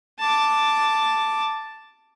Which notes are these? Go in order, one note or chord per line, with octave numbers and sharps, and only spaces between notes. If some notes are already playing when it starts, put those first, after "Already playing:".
A5 D6